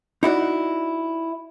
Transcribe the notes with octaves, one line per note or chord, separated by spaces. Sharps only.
D#4 E4 F#4 D5